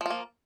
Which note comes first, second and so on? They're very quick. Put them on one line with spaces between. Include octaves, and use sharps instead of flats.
F3 F4 A#3